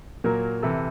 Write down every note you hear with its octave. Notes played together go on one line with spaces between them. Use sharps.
A#2 F#3 A#3 A#4
C3 E3 A4